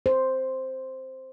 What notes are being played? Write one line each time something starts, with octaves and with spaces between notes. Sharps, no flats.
C5